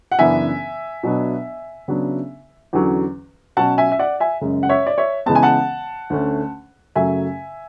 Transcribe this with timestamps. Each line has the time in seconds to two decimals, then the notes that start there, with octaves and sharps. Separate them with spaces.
0.12 F#5
0.19 F#2 C#3 E3 B3 D4 E5 G#5
1.03 B2 F#3 B3 D4
1.88 C#3 F#3 B3 D4
2.73 E2 D3 F#3 C#4
3.57 B2 F#3 C#4 F#5 A5
3.78 E5 G#5
3.92 E5
3.99 D5 F#5
4.20 E5 G#5
4.41 F#2 C#3 G#3 C#4
4.63 F#5
4.69 C#5 E5
4.87 D5
4.98 C#5 E5
5.26 C#3 E3 G#3 B3 A5
5.35 G#5
5.43 F#5 A5
6.10 D2 D3 A3 C#4
6.96 F#2 C#3 F#3 A3 E5 G#5